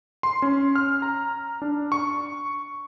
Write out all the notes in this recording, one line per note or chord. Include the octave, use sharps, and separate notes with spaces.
C6
C#4
F6
A#5
D4
C#6